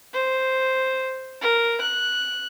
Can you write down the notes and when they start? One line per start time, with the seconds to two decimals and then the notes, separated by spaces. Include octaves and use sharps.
0.13 C5
1.41 A#4
1.81 F#6